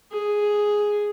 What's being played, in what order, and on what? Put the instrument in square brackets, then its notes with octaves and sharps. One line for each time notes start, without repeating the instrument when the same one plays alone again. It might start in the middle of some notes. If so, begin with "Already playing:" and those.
[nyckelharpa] G#4